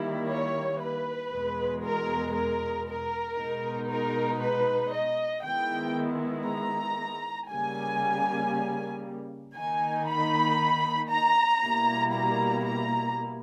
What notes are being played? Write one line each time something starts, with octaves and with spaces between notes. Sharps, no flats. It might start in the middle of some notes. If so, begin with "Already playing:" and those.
Already playing: D#3 G3 A#3 E4
C#5
B4
E2 B2 G#3
A#4
A#4
A#4
B2 G#3 D#4
A#4
B4
D#5
D#3 G#3 B3 E4 G5
A#5
C#3 G3 A#3 G#5
D#3 A#3 D#4 G#5
B5
A#5
B2 G3 A#3 E4
A#5
A#5